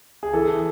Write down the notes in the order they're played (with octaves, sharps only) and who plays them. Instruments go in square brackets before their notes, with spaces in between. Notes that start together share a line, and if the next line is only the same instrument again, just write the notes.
[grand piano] G#4
E3 A4